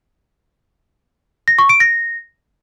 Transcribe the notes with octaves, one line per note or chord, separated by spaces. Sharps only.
A#6
C#6
D7
A#6